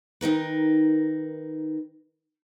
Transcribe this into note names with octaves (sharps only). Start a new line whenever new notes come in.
D#3 D#4 A#4 B4